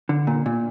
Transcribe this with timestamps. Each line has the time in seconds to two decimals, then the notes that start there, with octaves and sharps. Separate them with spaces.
0.09 D3
0.27 A#2
0.46 A#2